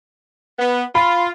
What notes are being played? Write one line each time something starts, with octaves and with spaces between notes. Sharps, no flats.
B3
F4 B5